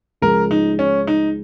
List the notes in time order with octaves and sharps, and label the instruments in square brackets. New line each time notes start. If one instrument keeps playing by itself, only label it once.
[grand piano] C#2 C#3 F3 [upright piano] A#4
[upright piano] D#4
C#4
D#4